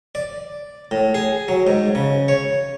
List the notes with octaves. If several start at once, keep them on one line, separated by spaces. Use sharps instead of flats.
D5
A2
G#4
F#3
G#2
C#3
C#5